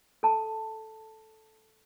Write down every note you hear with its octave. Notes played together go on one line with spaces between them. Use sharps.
A4 A5